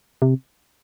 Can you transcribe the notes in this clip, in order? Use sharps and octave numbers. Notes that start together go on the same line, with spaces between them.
C3